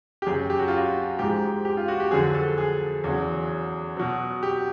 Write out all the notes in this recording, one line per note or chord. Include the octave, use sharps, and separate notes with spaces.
G4
F#2 C#3 F#3 G#4
G4
F#4
F4
F#4
G#2 F3 G#3 G4
G4
F4
F#4
G4
F2 D3 F#3 G#4
A4
G#4
E2 C#3 F#3
B2 F#3
G4